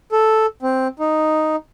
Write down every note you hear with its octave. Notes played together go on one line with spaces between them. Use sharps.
A4
C4
D#4